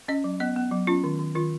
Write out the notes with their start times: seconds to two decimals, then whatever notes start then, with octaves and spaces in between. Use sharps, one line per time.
0.08 C#4 D#5
0.24 F#3
0.40 B3 D#5
0.56 B3
0.71 F#3
0.87 C#4 F4
1.04 D#3
1.19 D#3
1.35 D#3 F4